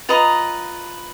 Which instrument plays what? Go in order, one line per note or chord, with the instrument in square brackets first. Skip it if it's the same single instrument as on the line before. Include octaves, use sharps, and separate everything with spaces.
[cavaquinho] F4 B4 D#5 A#5